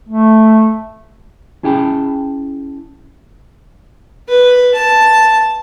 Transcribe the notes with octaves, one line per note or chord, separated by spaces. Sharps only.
A3
C#4 E4 G#4 G5 A5 B5
B4
A5